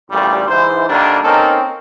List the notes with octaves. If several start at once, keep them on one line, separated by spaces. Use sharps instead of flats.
A1 D2 A#2 G3
G#2 E3 C5
D3 D#3 G3 A#3 D4
A#3 C4 C#4 D#4 A4 A#4